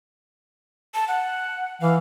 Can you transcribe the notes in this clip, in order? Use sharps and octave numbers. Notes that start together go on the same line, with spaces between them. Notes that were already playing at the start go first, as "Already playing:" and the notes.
A5
F#5
E3 F5